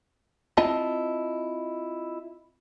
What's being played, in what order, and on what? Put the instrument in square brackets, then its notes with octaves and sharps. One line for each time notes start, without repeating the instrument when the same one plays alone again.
[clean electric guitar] C4 E4 F4 D#5 A5